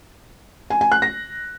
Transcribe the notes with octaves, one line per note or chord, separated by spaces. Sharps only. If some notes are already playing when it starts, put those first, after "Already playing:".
G#5
G#5
F#6
A#6